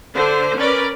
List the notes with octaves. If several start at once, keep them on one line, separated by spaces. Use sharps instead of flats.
D3 C5
C#4 A#4 B4 D5